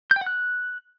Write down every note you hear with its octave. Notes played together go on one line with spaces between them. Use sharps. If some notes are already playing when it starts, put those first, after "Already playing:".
G6
G5
F#5
F#6